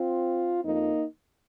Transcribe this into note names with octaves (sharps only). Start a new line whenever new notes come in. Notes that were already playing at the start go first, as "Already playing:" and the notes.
Already playing: C4 F4
F2 F3 A#3 D#4